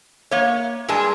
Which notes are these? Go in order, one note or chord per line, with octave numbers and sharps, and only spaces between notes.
A#3 C#5
G2 G#3 G#4 A5